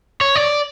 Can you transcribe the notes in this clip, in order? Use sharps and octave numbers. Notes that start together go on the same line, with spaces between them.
C#5
D5